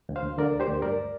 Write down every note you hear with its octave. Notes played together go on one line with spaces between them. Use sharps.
D2
C5 F5
D2
D3 A#4 D5
D2
G4 C5
D2
G2 A#4 D5